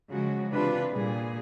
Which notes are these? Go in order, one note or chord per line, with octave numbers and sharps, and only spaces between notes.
C#3 F3 F#3 G#3 F#4
C3 E3 D4 F4 B4
A#2 G3 G#4